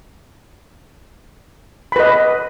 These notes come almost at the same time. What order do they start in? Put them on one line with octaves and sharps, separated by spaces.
B5 B4 D#5